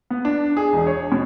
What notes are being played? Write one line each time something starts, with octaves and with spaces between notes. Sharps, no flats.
B3
D4
G#4
E1
C#5
B2